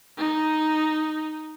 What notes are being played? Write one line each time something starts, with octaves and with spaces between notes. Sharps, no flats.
D#4